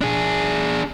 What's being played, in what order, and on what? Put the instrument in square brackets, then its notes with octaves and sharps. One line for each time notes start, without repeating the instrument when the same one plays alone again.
[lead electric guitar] D4 G#4